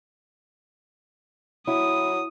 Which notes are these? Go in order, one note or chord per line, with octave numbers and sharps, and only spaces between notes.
F#3 E4 D#6